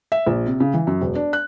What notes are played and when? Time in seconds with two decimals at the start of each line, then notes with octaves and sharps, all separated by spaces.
0.12 E5
0.27 A#1
0.46 C3
0.60 C#3
0.74 E3
0.87 F#2
1.01 E1
1.15 D4
1.33 F#6